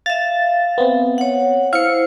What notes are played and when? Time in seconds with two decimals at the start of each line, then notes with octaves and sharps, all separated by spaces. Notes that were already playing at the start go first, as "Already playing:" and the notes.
0.06 E5 F5 A6
0.78 B3 C4
1.18 C#5 F#5
1.73 E4 C5 F5 C#7